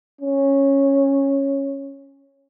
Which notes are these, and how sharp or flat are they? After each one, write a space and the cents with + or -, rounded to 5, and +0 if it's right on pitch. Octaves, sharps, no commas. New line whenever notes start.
C#4 -10